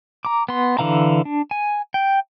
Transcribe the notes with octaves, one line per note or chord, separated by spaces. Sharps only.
A#5 D6
B3 C6
D3 E3 F5 A#5
D4
G#5
G5